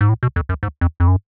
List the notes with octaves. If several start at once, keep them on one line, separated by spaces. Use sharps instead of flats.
G#2
A2
B2
F2
F#2
G#2
F2
F2
F#2